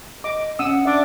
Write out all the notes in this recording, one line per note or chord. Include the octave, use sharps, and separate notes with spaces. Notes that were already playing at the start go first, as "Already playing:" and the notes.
D#5 D6
C#4 F#5 D#6 E6
D4 E5 D6